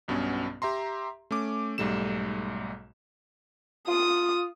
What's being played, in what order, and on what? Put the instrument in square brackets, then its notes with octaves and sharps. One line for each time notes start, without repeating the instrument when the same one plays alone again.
[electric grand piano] B1 G2 B2 B3 C#4
G4 E5 A#5 C6
A3 C#4 D6
B1 G#2 G3 A3 E7
[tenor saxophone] F4 [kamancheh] D#6